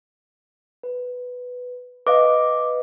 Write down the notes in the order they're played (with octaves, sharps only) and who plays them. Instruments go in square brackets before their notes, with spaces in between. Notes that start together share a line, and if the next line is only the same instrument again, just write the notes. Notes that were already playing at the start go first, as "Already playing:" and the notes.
[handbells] B4
[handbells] B4 D#5 F5 [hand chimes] D6